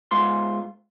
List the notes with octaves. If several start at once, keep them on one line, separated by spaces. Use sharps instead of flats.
G#2 F4 C6